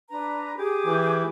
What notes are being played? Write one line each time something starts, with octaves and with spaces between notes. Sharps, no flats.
D4 B4 A#5
G4 G#4 D6
E3